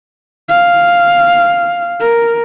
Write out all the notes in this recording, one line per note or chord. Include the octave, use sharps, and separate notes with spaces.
F5
A#4